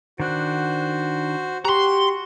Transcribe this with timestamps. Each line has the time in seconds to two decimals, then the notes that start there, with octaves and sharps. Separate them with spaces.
0.20 D#3 D4 F#4 C5 F#5
1.65 F#4 G4 A#5 C6